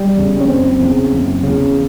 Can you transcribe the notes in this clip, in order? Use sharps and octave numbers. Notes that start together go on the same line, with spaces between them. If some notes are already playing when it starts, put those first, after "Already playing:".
Already playing: G3
E2 C#3
C#4
F#1 C4
E2 C#3
F#1
E2 C#3